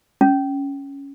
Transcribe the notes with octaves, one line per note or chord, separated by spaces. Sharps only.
C#4